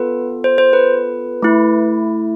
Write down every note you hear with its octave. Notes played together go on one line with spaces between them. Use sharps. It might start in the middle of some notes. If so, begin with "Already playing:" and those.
Already playing: B3 F4 A4 B4
C5
C5
B4
A3 E4